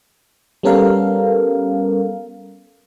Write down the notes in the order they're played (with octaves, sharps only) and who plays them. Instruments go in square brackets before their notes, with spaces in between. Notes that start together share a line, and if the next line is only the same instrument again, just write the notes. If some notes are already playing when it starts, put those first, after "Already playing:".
[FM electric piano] G3 B3 C#4 A4 A#4 F5